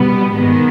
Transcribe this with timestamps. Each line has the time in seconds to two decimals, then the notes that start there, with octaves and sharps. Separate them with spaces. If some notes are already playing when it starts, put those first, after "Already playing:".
Already playing: B2 G3 B3
0.33 G#2 D#3 G#3 B3